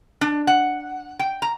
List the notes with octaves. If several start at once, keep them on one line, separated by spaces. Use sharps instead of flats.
D4
F#5
G5
A#5